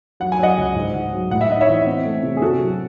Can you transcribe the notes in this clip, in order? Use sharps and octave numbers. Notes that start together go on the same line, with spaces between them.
F#3 F#5
G#5
F#3 D#5 F#5
C#2
G#2
G#2
F#3
A2 F#5
E5
D#4 D#5
C#5 E5
E3
C4
A3
C3
G#4
C3 F#4 A4
F#3